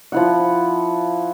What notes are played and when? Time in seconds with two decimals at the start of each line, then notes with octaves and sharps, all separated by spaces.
0.12 F3 E4 F#5